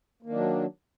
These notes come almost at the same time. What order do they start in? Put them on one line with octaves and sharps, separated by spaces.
A#3 D#3 D4 F#3